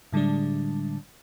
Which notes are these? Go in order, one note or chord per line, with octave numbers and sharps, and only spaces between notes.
A2 D3 G3 G#3 D4